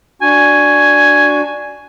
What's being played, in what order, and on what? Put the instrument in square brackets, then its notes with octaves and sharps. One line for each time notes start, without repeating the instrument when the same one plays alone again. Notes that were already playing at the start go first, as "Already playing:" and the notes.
[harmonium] D4 F#4 [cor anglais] G#5